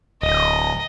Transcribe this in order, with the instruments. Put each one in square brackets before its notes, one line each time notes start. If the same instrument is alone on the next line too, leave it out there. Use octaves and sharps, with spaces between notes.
[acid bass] D1 [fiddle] D#5